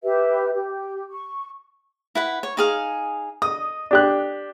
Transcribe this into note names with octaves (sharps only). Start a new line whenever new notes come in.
G4 B4 E5
G4
C#6
E4 B4 F#5
C#5
D#4 G#4 F5
D#5 D#6
D4 G4 F#6